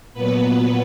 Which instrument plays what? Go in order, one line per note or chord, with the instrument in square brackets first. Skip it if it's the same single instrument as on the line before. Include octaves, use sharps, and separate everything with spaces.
[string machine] A#2 F#3 B3 B4